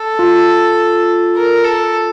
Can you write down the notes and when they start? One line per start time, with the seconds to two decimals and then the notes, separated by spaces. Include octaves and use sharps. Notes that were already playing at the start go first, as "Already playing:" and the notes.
Already playing: A4
0.19 F4
1.36 A#4
1.64 A4